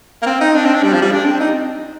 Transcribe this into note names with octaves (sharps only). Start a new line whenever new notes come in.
A#3
C4
D#4
D4
C4
D4
G3
F3
G3
D4
C4
D#4